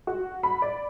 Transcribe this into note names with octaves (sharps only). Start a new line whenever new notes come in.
F#4
B5
D5